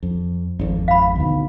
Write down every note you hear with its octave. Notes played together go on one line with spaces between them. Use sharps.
F2
G#1 F2
F5 B5
D2 B2 D#3